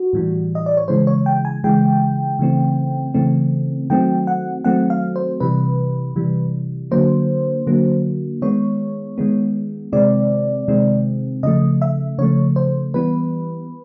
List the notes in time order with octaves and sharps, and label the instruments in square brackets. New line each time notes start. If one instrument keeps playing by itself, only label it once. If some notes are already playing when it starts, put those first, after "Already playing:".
Already playing: [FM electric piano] F#4
A2 E3 G3
D#5
D5
C#5
C#3 E3 G#3 C5
C#5
G5
G#5
C#3 E3 G#3 G5
C#3 E3 A3 C4
C#3 E3 A3 C4
D#3 F#3 A3 C4 G5
F#5
D#3 F#3 A3 C4 F#5
F5
C5
C3 E3 G3 B4
C3 E3 G3
D3 F#3 A#3 C5
D3 F#3 A#3
D#3 G#3 B3 C#5
D#3 G#3 B3
C3 D#3 G#3 C4 D5
C3 D#3 G#3 C4
C#3 F3 A3 D#5
E5
C#3 F3 A3 C#5
C5
E3 G3 B3 B4